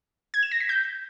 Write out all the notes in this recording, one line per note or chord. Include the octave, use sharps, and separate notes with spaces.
G#6
E7
A#6
B6
G6